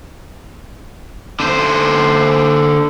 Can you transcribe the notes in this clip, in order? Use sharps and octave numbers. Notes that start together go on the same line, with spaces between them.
D3 C5